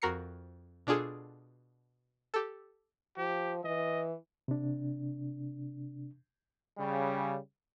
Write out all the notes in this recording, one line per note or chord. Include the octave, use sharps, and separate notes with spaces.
F2 F#4 A#4 A#5 C7 C#7
B2 D4 F4 G#4 A4
G4 A4
F3 G4
E3 D#5
C3 D4
C#3 G3